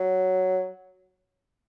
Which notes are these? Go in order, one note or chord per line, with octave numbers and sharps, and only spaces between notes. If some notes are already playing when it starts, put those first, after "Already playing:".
Already playing: F#3